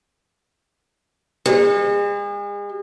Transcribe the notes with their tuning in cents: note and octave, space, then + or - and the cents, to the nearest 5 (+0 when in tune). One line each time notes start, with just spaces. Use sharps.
G#3 -40